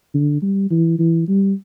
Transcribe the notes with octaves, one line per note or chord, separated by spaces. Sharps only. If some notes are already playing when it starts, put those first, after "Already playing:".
D3
G3
E3
E3
G3